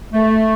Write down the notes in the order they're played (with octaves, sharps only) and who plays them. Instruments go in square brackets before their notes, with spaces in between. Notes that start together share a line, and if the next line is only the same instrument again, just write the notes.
[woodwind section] A3